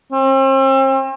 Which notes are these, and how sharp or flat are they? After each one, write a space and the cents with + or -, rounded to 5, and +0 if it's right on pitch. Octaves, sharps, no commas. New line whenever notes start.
C4 +40